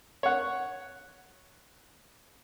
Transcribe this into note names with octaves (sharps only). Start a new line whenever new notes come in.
C#5 F#5